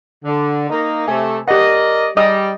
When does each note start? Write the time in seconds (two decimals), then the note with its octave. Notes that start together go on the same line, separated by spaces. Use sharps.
0.25 D3
0.70 A#3 D#4
1.08 C3 A3 G#5
1.48 G4 A#4 D5 D#5 F#5
2.17 G3 D#5 D#6 E6